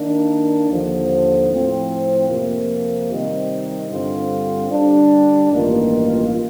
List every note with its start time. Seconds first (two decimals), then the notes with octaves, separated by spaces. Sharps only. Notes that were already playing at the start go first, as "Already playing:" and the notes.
Already playing: D#3 A#3 D4
0.69 D#2 D3 F3
1.50 A2 F3 C4 F4
2.29 F2 C3 F3 A#3
3.11 C3 D#3 G3 C4 D#4
3.90 G2 D3 G3 C4 F4
4.71 D3 G3 D4
5.50 A1 G2 D#3 A#3 F4